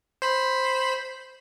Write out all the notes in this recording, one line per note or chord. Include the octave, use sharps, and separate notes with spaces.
C5 B5